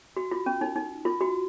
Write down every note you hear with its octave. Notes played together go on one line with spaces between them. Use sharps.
F#4
F4
C#4
D#4
D#4
F4
F#4